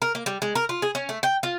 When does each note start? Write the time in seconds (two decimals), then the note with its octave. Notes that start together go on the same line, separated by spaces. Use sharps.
0.02 A#4
0.15 A#3
0.26 G3
0.42 G#3
0.55 A#4
0.69 F4
0.82 G#4
0.95 C#4
1.09 A3
1.23 G5
1.43 F4